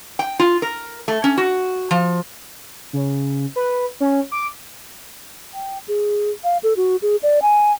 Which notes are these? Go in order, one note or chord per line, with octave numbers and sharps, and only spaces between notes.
G5
F4
A#4
A3
C#4
F#4
F3
C#3
B4
C#4
D6
G5
G#4
F5
A4
F#4
G#4
D5
G#5